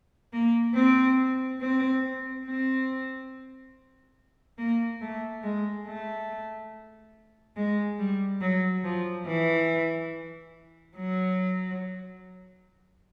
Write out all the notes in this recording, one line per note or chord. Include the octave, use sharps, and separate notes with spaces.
A#3
C4
C4
C4
A#3
A3
G#3
A3
G#3
G3
F#3
F3
E3
F#3